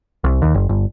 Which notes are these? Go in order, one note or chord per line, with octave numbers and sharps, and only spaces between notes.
C2
D#2
F#1
G1